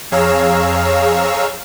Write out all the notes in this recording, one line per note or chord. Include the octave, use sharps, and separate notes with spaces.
F2 G#4 C#5 F5 A#5 E6